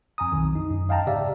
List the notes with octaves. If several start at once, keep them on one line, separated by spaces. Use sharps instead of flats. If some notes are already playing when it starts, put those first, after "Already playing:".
F2 G#5 A#5 D#6
B1 F2 D#3
D#4
F#2
D#5 F5 G5 A5 A#5
G#2 C#3 G4 D5 E5 F5